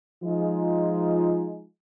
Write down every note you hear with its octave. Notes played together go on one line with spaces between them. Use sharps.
F3 G#3 D#4 F4